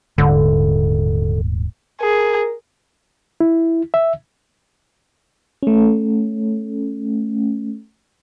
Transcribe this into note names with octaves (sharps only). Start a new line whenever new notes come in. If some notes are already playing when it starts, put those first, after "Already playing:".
D#1 G#2 D3
G#4 A#4
E4
E5
A3 C#4